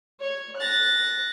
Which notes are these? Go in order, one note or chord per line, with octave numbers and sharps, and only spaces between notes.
C#5
F#6 A6 A#6